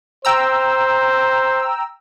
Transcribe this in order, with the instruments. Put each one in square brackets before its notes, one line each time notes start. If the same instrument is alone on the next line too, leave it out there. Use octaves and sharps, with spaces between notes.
[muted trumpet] C5 [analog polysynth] G5 A#5 E6